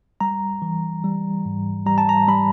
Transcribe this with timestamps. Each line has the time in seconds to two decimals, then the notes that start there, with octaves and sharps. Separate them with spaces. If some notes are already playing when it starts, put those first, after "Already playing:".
0.21 G3 A#5
0.62 E3
1.04 G3
1.45 G#2
1.86 G3 A#5
1.98 A5
2.09 A#5
2.28 G3 B5